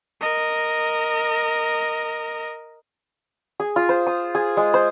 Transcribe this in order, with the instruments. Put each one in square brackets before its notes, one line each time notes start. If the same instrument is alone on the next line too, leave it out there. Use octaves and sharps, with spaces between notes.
[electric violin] A#4 D#5
[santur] G#4
F4
C5
D#6
G#4
G#3
C5